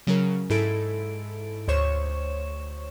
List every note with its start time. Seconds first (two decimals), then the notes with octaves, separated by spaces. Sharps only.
0.07 C#3 F#3 C#4 A#4
0.50 G#2 E4 A4 D7
1.68 D2 C5 C#5 C#6 E7